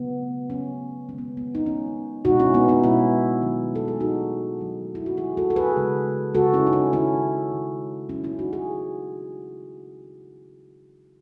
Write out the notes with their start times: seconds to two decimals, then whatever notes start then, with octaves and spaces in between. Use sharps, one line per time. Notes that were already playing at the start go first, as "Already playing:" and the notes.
Already playing: C#3 F#3 A3 B3
0.50 C#3 F#3 A3 C#4
1.09 D#3 G#3 C#4
1.18 B3
1.37 B3
1.55 D#4
1.66 D#3 G#3 C#4
2.25 B2 G#3 D#4 F#4
2.40 C#4 E4
2.54 B3 D#4
2.68 B3 D#4
2.83 B2 G#3 C#4 E4
3.42 D#3 F#3 A3
3.75 A4
3.88 G#4
4.00 D#3 F#3 A3 D#4 F#4
4.59 D#3 F#3 A3
4.95 E4
5.06 F#4
5.17 D#3 F#3 A3 E4 G#4
5.37 F#4 A4
5.50 A4
5.56 G#4 B4
5.76 C#3 G#3
6.34 C#3 G#3 F#4 A4
6.53 C#4 E4
6.67 D#4
6.73 C#4
6.93 D#3 G#3 C#4 E4
7.51 D#3 G#3
8.09 D#3 F#3 A3 C#4 E4
8.24 C#4 E4
8.39 D#4 F#4
8.53 G#4